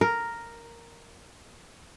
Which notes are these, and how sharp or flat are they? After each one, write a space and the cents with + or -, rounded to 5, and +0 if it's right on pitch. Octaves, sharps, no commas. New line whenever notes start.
A#4 +0